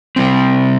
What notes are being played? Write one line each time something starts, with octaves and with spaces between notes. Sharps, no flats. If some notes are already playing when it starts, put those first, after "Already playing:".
C3 G3 C4